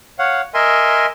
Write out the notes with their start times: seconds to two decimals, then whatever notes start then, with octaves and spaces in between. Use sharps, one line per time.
0.19 C#5 F5 F#5
0.54 A#4 D#5 E5 G#5 C6